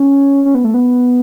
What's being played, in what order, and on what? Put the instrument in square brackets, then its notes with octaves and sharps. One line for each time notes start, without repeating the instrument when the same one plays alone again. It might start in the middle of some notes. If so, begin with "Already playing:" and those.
Already playing: [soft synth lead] C#4
C#4
B3
A3
B3